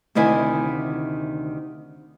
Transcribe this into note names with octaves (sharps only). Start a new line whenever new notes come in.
D2 C3 D#3 E4 G#5